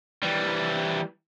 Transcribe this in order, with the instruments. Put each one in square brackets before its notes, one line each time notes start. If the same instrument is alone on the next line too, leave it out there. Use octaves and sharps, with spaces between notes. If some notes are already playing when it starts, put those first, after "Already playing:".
[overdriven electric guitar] E3 G3